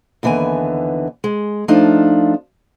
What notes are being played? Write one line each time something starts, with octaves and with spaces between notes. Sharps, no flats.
D#2 D3 E3 B3 G#5
G#3
F3 A3 D4 D#4 F4